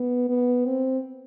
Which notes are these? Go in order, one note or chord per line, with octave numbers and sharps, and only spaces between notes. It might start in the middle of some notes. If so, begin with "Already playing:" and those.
Already playing: B3
B3
C4